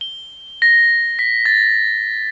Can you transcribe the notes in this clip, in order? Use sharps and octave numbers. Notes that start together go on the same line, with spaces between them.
G7
A#6
B6
A6